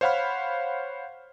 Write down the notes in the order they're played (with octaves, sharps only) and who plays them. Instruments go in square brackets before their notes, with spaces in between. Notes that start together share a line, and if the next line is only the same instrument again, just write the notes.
[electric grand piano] C5 C#5 F5 F#5 B5 F6